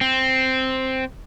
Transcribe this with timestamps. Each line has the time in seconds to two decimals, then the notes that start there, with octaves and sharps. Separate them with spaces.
0.01 C4